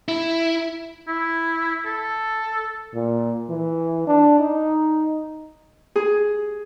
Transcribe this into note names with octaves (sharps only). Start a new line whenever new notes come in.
E4
E4
A4
A#2
E3
D4
D#4
G#4